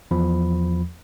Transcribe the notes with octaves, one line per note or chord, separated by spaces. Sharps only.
E2 F3 B5